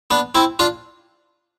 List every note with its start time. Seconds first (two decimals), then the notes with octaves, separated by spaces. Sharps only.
0.11 B3 D4
0.35 C4 E4
0.59 D4 F4